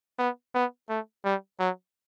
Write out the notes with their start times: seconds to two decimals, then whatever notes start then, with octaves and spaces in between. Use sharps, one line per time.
0.19 B3
0.54 B3
0.89 A3
1.24 G3
1.59 F#3